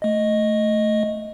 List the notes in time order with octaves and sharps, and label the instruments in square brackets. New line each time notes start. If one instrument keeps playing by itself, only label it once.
[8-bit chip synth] A3 D#5